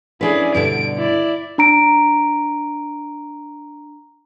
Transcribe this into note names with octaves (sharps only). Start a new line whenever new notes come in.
C#4 D4 E4 G#4 B4
G2 B2 D3 D7
E4 D5
D4 A#5 D7